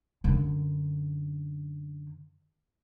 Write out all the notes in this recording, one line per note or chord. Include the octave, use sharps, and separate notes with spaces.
F#2 D3